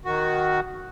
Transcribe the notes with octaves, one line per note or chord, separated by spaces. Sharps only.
D#3 F#4